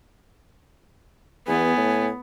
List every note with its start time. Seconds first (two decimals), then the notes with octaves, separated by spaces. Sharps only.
1.48 E2 B3 G#5
1.77 A2